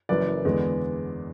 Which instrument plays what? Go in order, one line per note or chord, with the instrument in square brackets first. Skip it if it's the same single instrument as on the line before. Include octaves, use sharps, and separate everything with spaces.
[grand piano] F#1 F#2 E3 B4 D5
E2 D3 G#3 B3